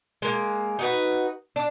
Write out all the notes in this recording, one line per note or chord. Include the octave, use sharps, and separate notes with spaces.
G#3 A#3
D#4 F#4 B4
D4